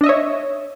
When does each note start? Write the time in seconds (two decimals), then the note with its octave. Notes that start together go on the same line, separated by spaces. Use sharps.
0.01 D4
0.04 D#5
0.06 E5
0.09 C#5